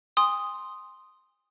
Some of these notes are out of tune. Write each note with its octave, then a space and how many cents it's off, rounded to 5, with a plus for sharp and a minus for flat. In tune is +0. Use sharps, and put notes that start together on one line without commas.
G#5 -40 C6 +0 D#6 +0